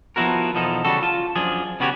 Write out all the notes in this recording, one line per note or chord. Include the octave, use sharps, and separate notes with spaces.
F3 B3 C4 E4 F#4 A#4
E2 B2 F3 D#4 A4
C#3 G3 F#4 A4
F4 A5
F#2 F3 D4 G#4
C#3 B3 F#4 G4 A4 C#5